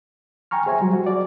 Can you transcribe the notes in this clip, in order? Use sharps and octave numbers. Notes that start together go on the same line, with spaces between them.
G5 G#5 A#5 C#6 F6
G#4 C5 E5 G#5
F#3 G3 F#4
F#4
D5